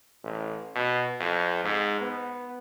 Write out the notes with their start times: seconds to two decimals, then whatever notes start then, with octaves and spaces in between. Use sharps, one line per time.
0.24 A1
0.75 B2
1.20 F2
1.64 G#2
2.01 B3